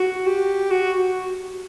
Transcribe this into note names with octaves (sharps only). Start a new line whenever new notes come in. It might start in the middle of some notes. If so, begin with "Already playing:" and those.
Already playing: F#4
G4
F#4